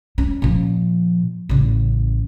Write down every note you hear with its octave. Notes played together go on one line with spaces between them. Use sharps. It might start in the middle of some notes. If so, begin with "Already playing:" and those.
C#4
A#2 F3
A1 C#3